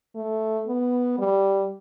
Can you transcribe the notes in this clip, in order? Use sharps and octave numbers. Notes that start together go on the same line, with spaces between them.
A3
B3
G3